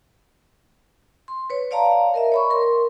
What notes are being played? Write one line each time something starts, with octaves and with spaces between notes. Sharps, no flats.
C6
B4 C#5
C#5 D5 F5 A5 A#5
A#4 D#5 E5
C#5 B5 C#6
A#4 C6